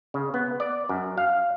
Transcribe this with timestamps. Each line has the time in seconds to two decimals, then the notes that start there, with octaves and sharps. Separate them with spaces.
0.14 C#3
0.34 B3
0.60 D5
0.89 F#2
1.18 F5